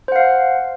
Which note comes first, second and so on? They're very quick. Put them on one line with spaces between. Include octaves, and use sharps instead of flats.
C5 F#5 F5